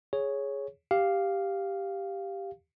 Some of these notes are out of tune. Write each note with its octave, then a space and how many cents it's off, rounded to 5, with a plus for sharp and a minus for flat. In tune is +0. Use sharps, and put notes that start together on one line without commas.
G#4 +0 C#5 +0
G4 +0 F5 +0